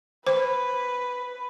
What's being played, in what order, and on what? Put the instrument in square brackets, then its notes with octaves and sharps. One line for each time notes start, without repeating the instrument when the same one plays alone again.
[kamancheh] B4 [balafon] C5